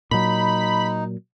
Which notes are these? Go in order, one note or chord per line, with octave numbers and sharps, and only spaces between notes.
A#2 F#3 D#4 B5